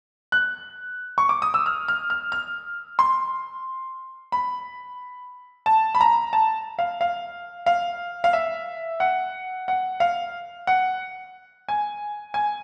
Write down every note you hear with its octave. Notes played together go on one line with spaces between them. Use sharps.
F#6
C#6
D6
D#6
E6
F6
F6
F6
F6
C6
B5
A5
B5
A#5
A5
F5
F5
F5
F5
E5
F#5
F#5
F5
F#5
G#5
G#5